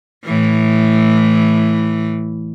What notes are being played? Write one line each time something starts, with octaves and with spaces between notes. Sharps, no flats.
A2 E3